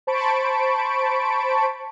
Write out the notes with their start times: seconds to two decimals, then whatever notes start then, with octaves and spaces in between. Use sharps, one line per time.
0.07 C5 A5 B5 C#6 D7